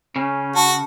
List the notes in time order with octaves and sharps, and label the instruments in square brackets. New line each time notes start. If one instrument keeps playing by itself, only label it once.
[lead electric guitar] C#3 [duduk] C#4
[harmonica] F#4 [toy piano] A5